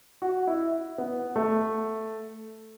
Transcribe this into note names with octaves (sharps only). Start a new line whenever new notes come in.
F#4
E4
B3
A3